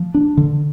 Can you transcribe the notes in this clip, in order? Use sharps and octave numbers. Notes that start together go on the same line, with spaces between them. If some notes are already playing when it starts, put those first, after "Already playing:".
Already playing: F3
D4
D3